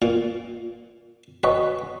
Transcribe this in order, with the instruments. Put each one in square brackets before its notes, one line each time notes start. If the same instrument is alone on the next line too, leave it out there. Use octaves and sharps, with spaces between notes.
[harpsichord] A#2
[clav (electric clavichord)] F#4 C#5 D#5 [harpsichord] B4